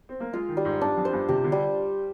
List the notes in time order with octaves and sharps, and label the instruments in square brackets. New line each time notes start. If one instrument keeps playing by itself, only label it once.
[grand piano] C4
A#3
[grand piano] G#3 [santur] F4
[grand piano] D#3
[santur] G3
[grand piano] G#2
[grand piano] G2 [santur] D4
[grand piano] F2
[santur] C5
[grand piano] G2
[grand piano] C3 [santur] G4
[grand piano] D3
[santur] G3